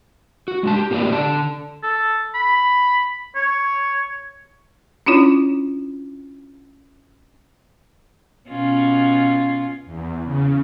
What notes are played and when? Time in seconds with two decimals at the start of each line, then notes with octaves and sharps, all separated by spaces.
0.48 F#4
0.63 G#3 D4 A5
0.76 G4
0.90 A2 A#3 B3 F#4 G4 D5
1.12 D3 D5 A5
1.83 A4
2.34 B5
3.36 C#5
5.06 C#4 D4 E4 F4 C#5
8.50 B2 C#4 F4
9.86 E2
10.24 C#3